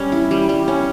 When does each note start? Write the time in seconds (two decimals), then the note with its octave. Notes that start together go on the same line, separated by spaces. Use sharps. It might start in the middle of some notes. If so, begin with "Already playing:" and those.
Already playing: G3 C#4
0.12 E4
0.31 G3
0.49 G3
0.68 C#4